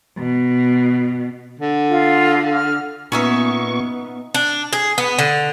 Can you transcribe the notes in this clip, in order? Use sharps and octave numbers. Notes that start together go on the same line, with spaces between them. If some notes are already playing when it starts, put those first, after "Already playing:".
B2
D3
F4
F6
A#2 B3 C#4 D#4 E5 C#6
D4
G#4
B3
D3